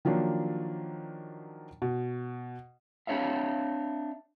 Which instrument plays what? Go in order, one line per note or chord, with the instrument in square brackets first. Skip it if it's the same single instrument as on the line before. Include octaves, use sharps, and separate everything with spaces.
[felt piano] D#3 F3 F#3 A#3 D4
B2
[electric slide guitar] C4 D4 C#5 E5 F5